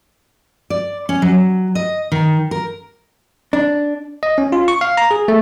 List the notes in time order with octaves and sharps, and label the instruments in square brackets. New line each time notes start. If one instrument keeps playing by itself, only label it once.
[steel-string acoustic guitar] D5
C#4
F#3
D#5
D#3
A#4
[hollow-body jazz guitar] D4
[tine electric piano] D#5
C#4
F4
C#6
F5
A#5
G#4
A3